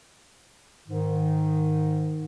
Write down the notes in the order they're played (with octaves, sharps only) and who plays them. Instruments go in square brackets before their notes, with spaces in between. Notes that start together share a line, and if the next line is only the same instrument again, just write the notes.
[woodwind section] G#2 D#3